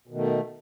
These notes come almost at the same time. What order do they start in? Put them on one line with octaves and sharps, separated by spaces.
B2 D#3 A3